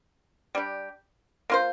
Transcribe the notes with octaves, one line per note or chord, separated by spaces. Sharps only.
G3 D4 G4
A#3 F4 C5